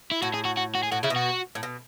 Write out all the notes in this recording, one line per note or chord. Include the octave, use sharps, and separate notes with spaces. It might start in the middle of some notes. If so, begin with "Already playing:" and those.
E4
A2 F#4
G#4
F#4
F#4
F#4
G#4
A2 F#4
C#3 E4
B2
F#4
A2
B2